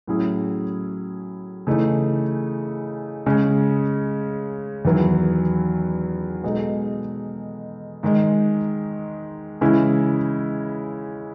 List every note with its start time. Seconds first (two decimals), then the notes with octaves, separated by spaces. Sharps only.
0.07 A2 F#3 C#4 E4 G#4
1.67 C#3 E3 A3 D#4
3.26 C#3 G#3 C#4
4.85 E2 D#3 F#3 B3 E4
6.43 B2 G#3 D#4 A4
8.03 G#2 D#3 G#3
9.61 C#3 E3 G#3 C#4 E4